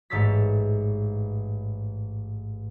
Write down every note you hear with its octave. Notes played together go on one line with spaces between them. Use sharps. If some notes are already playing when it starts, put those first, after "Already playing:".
A1 G#2 C#5 E6 A6 B6